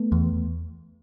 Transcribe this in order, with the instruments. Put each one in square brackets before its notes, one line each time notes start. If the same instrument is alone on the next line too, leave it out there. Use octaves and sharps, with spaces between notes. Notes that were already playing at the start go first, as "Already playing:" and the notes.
Already playing: [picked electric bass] A3 B3
E2